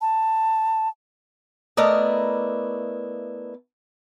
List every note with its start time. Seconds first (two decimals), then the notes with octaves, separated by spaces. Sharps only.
0.01 A5
1.77 A3 B3 E4 A#4 D5 D#5